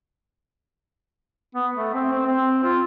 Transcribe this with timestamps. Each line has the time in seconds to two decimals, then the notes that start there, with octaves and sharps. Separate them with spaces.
1.55 B3
1.76 A3
1.94 C4
2.13 C4
2.26 C4
2.64 F4